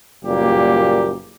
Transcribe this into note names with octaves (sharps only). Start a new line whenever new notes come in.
F#1 A#2 G3 A#3 G4